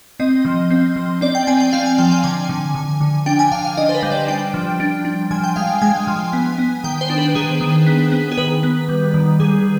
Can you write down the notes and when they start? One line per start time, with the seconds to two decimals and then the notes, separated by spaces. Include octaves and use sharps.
0.20 C4 D#5
0.45 F3
0.70 C4
0.96 F3
1.21 C4 D5
1.35 G5
1.47 C4 G#5
1.60 G5
1.73 C4 F5
1.86 G#5
1.98 F3 G5
2.11 G5
2.24 D3 G#5
2.49 D3
2.75 D3
3.01 D3
3.26 D4 G5
3.39 G#5
3.52 D3 F5
3.64 F5
3.77 D4 D#5
3.89 C5
3.95 B4
4.03 G3
4.11 D5
4.28 D4 G5
4.54 F3
4.80 D4
5.05 D4
5.31 F3 G#5
5.44 G5
5.56 G#3 F5
5.82 G#3 G#5
6.07 F3
6.33 B3
6.58 B3
6.84 D#3 G5
7.01 C5
7.10 D4
7.18 B4
7.35 D#3 G#4
7.61 D#3
7.86 B3
8.12 B3
8.32 G#4
8.37 D#3 B4
8.63 B3
8.89 G3
9.14 D#3
9.40 G3 G#4